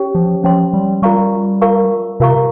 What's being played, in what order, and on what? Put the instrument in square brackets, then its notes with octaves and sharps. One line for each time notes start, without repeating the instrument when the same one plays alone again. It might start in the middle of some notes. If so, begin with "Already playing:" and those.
Already playing: [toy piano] C#4 G4 C#5 G5
[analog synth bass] F3
[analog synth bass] F3 [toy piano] C#4 G4 C#5 G5 C6
[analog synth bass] G3
[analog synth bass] G3 [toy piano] F4 A#4 F5 A#5 C#6
[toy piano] F4 A#4 F5 A#5 C#6
[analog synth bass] C3 [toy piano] F4 A#4 F5 A#5 C#6